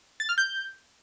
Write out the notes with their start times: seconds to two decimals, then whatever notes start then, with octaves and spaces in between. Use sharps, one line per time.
0.20 A6
0.29 F6
0.38 G6